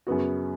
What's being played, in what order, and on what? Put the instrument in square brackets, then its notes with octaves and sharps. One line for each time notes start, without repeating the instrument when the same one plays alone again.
[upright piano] F#2 C#3 B3 F#4